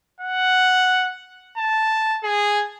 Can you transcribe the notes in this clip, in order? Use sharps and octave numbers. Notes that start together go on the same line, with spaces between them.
F#5
A5
G#4